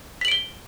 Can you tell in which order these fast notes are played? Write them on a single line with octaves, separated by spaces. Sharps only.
B6 F#7 D7 G7